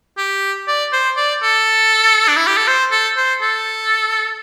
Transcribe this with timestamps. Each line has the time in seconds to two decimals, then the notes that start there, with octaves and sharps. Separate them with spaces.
0.18 G4
0.68 D5
0.93 C5
1.17 D5
1.43 A4
2.28 D4
2.37 E4
2.47 G4
2.57 A4
2.68 C5
2.91 A4
3.17 C5
3.42 A4